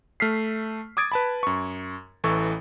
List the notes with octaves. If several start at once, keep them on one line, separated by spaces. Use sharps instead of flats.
A3 F6 B6 C7
D6 D#6 G#6 A6 D7
B4 A5 B5
F#2 C#6
A1 E3 A4 C#6